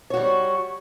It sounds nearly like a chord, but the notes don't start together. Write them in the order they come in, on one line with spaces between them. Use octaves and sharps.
C#5 F#4 G3